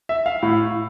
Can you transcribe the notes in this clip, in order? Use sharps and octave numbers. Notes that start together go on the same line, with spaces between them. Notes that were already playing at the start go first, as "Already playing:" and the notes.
E5
F5
A2